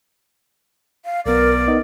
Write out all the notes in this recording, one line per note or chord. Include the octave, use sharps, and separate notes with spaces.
F5
B1 B3 A#4 D5
B3 D#4 D#5